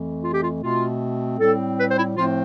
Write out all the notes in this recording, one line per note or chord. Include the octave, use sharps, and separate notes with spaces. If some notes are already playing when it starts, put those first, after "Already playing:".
Already playing: F2 E3 A3
F4
G4
F4
B2 A3 C4 F4
A2 G3 C4 A4
B4
C5
E4
A2 F3 A3 C4 F4